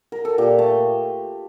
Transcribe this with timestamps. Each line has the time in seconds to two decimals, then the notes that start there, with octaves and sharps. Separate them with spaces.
0.12 A#4
0.25 A4
0.38 A#2 G4
0.59 A3 A4